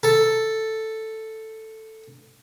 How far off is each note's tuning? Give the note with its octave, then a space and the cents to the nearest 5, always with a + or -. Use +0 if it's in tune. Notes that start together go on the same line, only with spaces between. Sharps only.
A4 +5